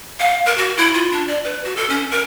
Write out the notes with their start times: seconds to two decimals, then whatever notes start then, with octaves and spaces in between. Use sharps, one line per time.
0.20 F5
0.46 A#4
0.58 F#4
0.77 E4
0.94 F4
1.12 D4
1.28 D5
1.44 B4
1.65 F#4
1.77 A4
1.89 C#4
2.11 A#4